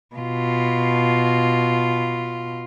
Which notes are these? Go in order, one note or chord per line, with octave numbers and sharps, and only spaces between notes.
B2 F4